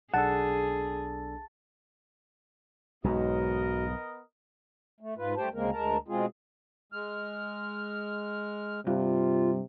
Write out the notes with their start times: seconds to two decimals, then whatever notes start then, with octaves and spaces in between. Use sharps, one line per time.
0.14 B1 D4 G#4 A4 F#5 A5 A6
3.04 B1 G#2 G#3 B3 D#4 F#4 A#4 D#5
5.00 A3
5.18 G#2 F4 B4
5.37 G2 A3 G4 C5 G5 A5
5.54 D2 C#3 G#3 A#3 C4 A#4
5.72 D2 G#3 A#4 A5 A#5
6.08 B2 G#3 C4 F4 G#4
6.92 G#3 F6
8.87 G2 C3 F4